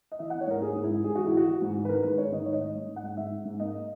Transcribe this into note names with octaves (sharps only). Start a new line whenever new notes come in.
D#5
E3 E5
F#5
B3
C#5
G#2 A#4
G#2 G#4
G#2
E4
G#2
G#2 G#4
E3 F#4
E4
E3 F#4
E3
G#2
E3
B4
D#3 A#4
G#3 B4
G#2 C#5
D#3 D#5
G#2 C#5
D#5
G#2
G#2
G#2
F#5
G#2
G#2 E5
G#2
G#2
A#3 D#5